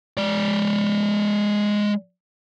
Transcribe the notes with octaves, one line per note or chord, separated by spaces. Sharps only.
G#3 D5